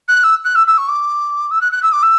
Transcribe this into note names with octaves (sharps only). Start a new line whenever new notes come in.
F#6
E6
F#6
E6
E6
C#6
D6
E6
F#6
F#6
E6
D6
E6